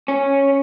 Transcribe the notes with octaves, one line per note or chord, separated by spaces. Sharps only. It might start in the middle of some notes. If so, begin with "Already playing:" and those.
C#4